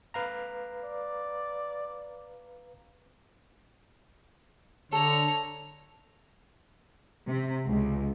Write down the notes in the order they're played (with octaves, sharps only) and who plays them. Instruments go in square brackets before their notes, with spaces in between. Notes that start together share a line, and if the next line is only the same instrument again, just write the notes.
[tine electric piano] B4 F5 A#5
[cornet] D5
[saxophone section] D3 [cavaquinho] A4 [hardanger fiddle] C#5 A#5
[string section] C3
C#2